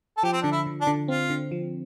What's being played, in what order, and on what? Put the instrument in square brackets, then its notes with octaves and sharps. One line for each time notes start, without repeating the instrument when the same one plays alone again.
[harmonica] A4
[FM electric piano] F3 [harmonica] G4
[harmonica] C4
[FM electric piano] D3 [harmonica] D4
[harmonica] E4
[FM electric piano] D3
[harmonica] D4
[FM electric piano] D3
[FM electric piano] C4 [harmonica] F4
[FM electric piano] D3
F3